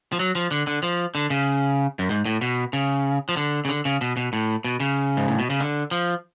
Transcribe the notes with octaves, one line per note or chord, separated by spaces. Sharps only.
F3
F#3
F3
D3
D3
F3
D3
C#3
F#2
G#2
A2
B2
C#3
F3
D3
C#3
D3
C#3
B2
B2
A2
B2
C#3
G#2
A2
B2
C#3
D3
F3